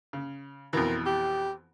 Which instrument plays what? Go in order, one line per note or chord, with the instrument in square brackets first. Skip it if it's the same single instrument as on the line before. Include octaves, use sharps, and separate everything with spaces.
[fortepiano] C#3
[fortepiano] F2 B2 E3 [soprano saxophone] A#4
[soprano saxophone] G4